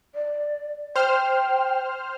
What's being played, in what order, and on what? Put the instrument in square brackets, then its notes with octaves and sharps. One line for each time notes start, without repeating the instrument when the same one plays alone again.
[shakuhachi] D5
[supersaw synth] C5 F6 [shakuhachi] G5